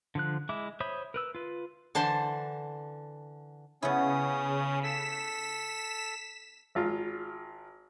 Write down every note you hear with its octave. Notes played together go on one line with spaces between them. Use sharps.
D3 F3 F#6
G#3 E4 E5 D6
C5 C#5 E5 B5 D#6
A#4 B4 E6
F4 B4
D3 E3 C5 A5 C6
C#3 B3 C#4 E4 D#6
A4 B6 E7
G#1 F4